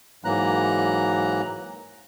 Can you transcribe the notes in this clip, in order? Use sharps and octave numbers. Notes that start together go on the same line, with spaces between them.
G#2 E3 F#3 A#3 A#5 F#6